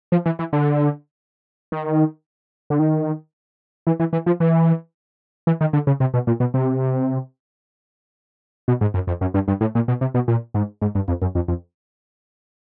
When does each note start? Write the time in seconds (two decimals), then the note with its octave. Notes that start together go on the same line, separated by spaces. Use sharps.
0.12 F3
0.26 E3
0.39 E3
0.53 D3
1.72 D#3
2.70 D3
2.79 D#3
3.87 E3
4.00 E3
4.13 E3
4.26 F3
4.40 E3
5.47 E3
5.61 D#3
5.73 D3
5.87 C#3
6.00 C3
6.14 B2
6.27 A#2
6.40 B2
6.54 C3
8.68 B2
8.81 G#2
8.94 F#2
9.07 F2
9.21 F#2
9.34 G2
9.48 G2
9.61 A2
9.75 A#2
9.88 B2
10.01 C3
10.14 B2
10.28 A#2
10.54 G#2
10.82 G#2
10.95 G2
11.08 F2
11.22 F#2
11.35 F2
11.48 F2